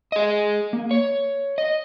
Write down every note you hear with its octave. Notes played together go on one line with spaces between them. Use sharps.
G#4 D#5
A#3
C#5
D#5